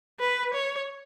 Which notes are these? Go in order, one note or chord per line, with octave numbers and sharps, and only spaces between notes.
B4
C#5